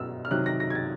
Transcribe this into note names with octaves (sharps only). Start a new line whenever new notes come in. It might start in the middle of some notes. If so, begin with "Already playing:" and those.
Already playing: B2 F#3 E6 F6
F6
C3 D#3 F#3 F#6
A#6
A#6
G#6
A6